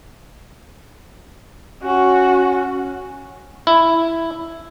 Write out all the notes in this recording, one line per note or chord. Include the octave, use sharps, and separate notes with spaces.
C#4 F#4
E4